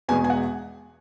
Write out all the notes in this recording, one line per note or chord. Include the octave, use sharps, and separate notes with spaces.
E2 B2 G#3 G#5
G#5
F#5